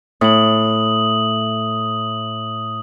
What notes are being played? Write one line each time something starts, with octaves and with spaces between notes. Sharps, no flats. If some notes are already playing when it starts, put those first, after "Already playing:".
A2 D#6 F#7